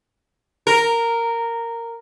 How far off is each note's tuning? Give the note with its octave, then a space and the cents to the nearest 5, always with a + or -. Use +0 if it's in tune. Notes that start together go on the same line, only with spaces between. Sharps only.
A#4 -10